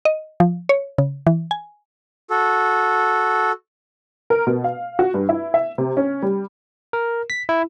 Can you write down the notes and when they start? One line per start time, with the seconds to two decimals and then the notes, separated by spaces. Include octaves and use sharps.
0.05 D#5
0.40 F3
0.69 C#5
0.98 C#3
1.27 E3
1.51 G#5
2.30 F#4 A4
4.30 A#4
4.47 B2
4.64 F5
4.99 F#4
5.14 G2
5.29 E4
5.54 E5
5.78 C3
5.97 C#4
6.23 G3
6.93 A#4
7.30 B6
7.49 E4